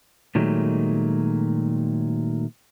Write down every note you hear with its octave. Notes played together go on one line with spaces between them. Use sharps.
A#2 D#3 F#3 G#3 A3